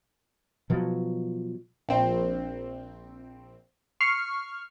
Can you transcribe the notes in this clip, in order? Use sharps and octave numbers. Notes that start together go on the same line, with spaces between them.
B2 F3 F#3
A#1 C4
C#6 F6 C7